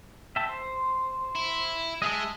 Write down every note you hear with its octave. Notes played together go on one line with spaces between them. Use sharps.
E5 G5 A5
C5
E4
G#3 G#4 D#5 E5 A5